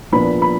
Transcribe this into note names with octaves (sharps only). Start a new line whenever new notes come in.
A#2 F3 B3 D4 B5
B5